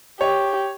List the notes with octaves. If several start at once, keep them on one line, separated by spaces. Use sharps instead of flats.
G4 C#5